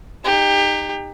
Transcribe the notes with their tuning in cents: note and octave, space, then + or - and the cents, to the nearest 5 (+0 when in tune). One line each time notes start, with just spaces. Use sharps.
D#4 -15 G4 +25